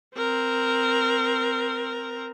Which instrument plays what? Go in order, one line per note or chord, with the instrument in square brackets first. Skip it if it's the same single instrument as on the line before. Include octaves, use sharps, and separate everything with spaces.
[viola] C4 A#4